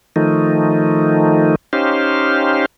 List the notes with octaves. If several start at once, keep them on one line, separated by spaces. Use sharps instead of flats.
D#3 F3 A3 D#4
C#4 D#4 G4 C5 F5